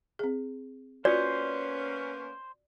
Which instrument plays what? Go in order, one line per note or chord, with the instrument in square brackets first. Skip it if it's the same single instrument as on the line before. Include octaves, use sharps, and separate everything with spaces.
[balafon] C4 G#4
[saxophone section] A#3 B3 C#4 [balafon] F4 F#4 [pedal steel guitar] C5 [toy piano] D5